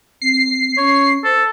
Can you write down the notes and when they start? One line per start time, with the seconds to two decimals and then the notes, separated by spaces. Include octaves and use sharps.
0.22 C4 C7
0.77 C#4 C#5
1.24 A4 C5